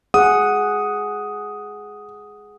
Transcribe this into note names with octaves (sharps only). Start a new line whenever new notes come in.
G#4 F#5 D#6